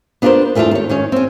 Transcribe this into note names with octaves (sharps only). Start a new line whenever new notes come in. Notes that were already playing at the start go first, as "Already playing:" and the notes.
B3 D4 F4 G#4 A#4 C5
E2 D#3 A3 D4 F4 A5
D#2 C#5
D#3 C#4 C#5
C4 C#4